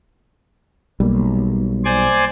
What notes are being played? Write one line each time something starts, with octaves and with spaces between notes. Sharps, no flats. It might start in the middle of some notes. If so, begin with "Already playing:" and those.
B1 G3 A#3
C5 D5 G#5